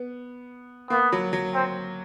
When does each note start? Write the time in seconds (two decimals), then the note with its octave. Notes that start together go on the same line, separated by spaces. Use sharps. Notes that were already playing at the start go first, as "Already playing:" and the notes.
Already playing: B3
0.90 A#3 B3
1.12 F#3
1.33 F#3
1.54 C4